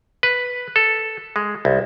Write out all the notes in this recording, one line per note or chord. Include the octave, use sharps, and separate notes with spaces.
B4
A4
G#3
C2